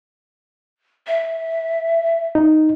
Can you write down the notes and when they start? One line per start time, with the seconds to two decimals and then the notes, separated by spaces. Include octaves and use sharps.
1.07 E5
2.35 D#4